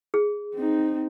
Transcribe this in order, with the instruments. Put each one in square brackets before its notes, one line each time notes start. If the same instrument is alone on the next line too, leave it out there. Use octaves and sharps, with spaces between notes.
[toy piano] G#4
[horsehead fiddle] C4 D#4